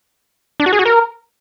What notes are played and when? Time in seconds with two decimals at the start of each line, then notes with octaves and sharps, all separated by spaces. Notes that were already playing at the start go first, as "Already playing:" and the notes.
0.60 D4
0.66 F#4
0.73 G#4
0.79 F#4
0.85 A#4